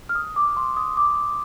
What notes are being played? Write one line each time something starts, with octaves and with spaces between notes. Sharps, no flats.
F6
D#6
D6
C6
D#6
D6